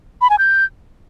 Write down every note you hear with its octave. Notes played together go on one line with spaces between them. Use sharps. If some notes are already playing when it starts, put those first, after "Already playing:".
B5
G#5
G6